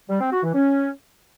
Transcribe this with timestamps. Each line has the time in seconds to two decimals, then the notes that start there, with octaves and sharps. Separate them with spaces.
0.10 G3
0.21 C4
0.32 F#4
0.43 E3
0.55 C#4